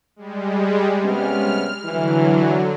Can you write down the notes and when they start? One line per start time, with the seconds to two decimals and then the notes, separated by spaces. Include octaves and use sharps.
0.16 G3 G#3
1.04 C3 B3 C#4 F6
1.85 D3 E3 F#3